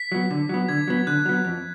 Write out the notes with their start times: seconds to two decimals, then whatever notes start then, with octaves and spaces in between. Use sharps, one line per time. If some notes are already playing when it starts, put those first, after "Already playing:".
Already playing: B6
0.12 F#3 B3
0.31 D3
0.49 F#3 B3
0.68 D3 G#6
0.88 F#3 B3
1.07 D3 F#6
1.26 F#3 B3
1.45 F2